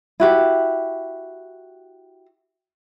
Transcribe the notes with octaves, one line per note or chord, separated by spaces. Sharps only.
E4 F#4 G4